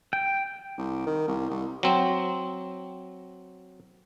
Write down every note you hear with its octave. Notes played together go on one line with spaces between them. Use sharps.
G5
C2
D#3
C2
C2
F#3 C4